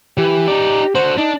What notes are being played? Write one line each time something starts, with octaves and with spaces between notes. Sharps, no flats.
E3 G4
D#4 D5
D3 F#4 C5
D4 D#4